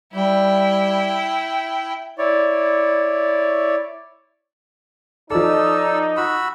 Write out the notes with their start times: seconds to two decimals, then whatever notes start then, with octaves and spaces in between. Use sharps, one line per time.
0.14 G3 E4 G5
2.18 E4 C#5 D5
5.30 F3 D#4 A4 D5 E6
6.17 F#4 B5 E6